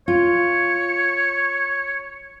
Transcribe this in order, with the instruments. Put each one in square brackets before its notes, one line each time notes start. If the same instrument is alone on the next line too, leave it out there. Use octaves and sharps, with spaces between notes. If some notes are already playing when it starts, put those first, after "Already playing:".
[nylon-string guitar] F4 [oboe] C#5